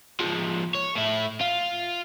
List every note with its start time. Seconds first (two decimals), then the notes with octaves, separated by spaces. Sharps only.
0.20 F3 G#3
0.75 C#5
0.96 A2 E4
1.41 F4